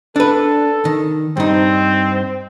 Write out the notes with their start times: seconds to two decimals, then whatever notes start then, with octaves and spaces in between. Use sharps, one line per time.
0.16 D4 A4 B4
0.85 D#3
1.37 G2 C4 D#4